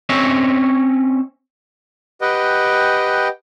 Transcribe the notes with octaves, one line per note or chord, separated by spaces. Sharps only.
C4 C#4 C#5 D#5 E5
G4 B4 D#5 F#5 G5